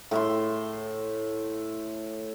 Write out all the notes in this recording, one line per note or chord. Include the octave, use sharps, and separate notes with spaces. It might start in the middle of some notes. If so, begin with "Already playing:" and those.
A2 E5 C6